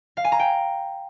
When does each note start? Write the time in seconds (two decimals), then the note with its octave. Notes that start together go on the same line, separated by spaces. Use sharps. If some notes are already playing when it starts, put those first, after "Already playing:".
0.17 F5
0.24 G#5
0.32 A#5
0.39 G5